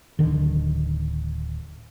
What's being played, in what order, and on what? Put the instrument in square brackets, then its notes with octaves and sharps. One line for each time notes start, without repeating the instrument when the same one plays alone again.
[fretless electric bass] D1 D3 D#3